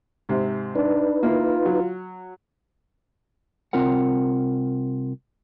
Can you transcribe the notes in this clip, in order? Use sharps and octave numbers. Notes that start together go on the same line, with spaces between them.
G#2 C3
D4 D#4 B4
A#3 E4 F4
F#3
C2 C4 F4 A#4 F#5